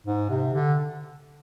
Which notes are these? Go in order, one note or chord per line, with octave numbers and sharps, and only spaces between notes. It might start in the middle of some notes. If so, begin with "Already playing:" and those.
G#2
C3
D3